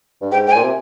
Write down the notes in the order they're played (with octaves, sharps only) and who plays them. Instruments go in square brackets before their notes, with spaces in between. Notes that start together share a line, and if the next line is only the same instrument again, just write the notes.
[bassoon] G2
[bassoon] G#2 [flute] G5
[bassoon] G#2 [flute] G5
[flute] G#5
[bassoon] A#2
C3